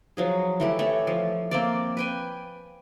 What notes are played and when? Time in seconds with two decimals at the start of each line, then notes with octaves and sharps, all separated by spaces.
0.17 F3 F#3 G#4
0.60 E3 A3 G4
0.79 A3 C#5
1.07 F3
1.51 A#3 C4 D5
1.97 B4 G5 G#5